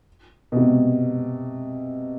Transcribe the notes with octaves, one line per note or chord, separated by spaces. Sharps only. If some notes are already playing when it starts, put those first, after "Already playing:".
B2
C3